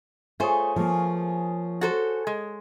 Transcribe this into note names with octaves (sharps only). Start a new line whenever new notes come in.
A3 F4 G#4 C5 C#5 G#5
F3 A#3
F#4 A4 C5
G#3